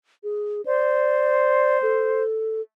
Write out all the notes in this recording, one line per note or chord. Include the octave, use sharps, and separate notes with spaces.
G#4
C5 D5
A4